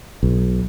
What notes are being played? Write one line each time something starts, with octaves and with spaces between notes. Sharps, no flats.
B1